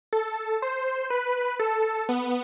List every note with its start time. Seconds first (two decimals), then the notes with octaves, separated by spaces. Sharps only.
0.13 A4
0.62 C5
1.10 B4
1.60 A4
2.09 B3